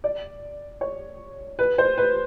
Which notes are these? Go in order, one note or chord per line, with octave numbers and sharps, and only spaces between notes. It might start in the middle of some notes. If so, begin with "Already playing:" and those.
D5
C#5
B4
C5
B4